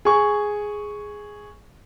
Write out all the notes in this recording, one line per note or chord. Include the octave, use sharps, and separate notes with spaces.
G#4 C#6